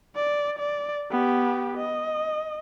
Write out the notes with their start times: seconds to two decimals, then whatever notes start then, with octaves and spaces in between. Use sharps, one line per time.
0.16 D5
0.58 D5
1.11 B3 G4
1.78 D#5